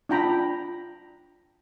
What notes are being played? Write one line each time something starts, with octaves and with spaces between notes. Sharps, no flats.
D4 F4 G5 A#5 B5